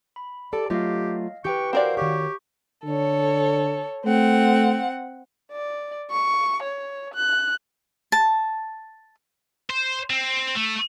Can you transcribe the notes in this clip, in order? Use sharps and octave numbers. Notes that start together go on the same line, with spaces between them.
B5
G4 A4 D5 A5
F#3 A3 F4 G4 D#5 F5
E3 G4 B4 G5 C#6 G6
C4 F#4 A#4 C5 D5 F5 F#5
D#3 F#4 G4 C#5 C#6
D3 A4 C#5
A3 C4 F#5
D5
C#6
C#5
F#6
A5
C5
C4
A3